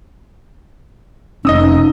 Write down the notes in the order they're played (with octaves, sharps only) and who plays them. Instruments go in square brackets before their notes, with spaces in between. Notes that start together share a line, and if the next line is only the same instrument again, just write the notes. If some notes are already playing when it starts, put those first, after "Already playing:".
[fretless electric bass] F1 C#4 [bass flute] D#4 [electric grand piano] D#5 D#6 E6